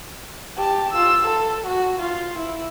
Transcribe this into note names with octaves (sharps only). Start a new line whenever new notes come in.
G4 A5
F4 E6
A4
F#4
F4
E4